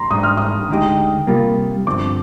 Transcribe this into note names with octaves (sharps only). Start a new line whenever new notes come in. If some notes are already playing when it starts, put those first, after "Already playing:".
Already playing: A#5 C6
G#2 G3 D4 D#6
F6
D#6
D2 D3 G#3 D#4 G4
C3 G3 A#3 F4
G2 D3 F3 C4 D6